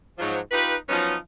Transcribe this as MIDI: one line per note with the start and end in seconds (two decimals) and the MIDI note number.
0.19 0.39 44
0.19 0.39 53
0.19 0.39 54
0.52 0.75 63
0.52 0.75 65
0.52 0.75 67
0.52 0.75 71
0.89 1.16 53
0.89 1.16 54
0.89 1.16 59
0.89 1.16 61
0.89 1.16 63